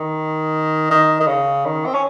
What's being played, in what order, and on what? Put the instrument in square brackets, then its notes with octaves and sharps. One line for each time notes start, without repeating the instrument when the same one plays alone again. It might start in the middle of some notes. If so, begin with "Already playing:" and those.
Already playing: [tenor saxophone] D#3
D#3
D#3
C#3
D#3
C4
C#4